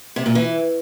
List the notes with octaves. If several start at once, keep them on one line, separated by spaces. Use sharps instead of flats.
C3
A#2
E3